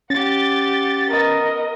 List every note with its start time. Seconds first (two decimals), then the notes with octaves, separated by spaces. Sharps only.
0.10 C#4 G4 F#5 A6
1.10 B3 A#4 D#5